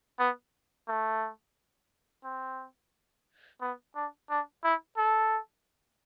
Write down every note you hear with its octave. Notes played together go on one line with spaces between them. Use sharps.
B3
A3
C4
B3
D4
D4
E4
A4